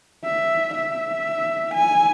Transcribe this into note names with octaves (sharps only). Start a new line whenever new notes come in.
E5
E5
G#5